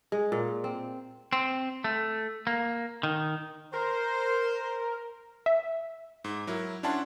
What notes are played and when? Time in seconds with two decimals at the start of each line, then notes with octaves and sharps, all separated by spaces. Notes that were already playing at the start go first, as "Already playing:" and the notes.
0.12 G#3
0.32 A#2
0.64 C4
1.33 C4
1.84 A3
2.47 A#3
3.03 D#3
3.74 A#4 C5
5.46 E5
6.24 G#2
6.47 F#3 E4 A#4
6.83 C#4 D4 E4 F#5 A5 C6